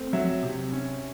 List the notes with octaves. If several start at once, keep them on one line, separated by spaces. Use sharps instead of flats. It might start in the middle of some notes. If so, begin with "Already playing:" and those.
Already playing: A3 C4
F#3 E5
C3
C#4